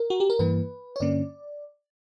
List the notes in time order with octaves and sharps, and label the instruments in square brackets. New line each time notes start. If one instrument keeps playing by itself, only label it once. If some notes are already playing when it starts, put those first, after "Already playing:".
Already playing: [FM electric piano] A#4
F#4
G4
A#4
G2 E3 A#3 B4
C#5
G2 D3 A#3 C#4 D5